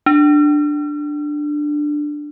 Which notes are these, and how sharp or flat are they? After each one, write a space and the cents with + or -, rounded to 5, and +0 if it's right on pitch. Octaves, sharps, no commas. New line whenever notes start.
D4 +10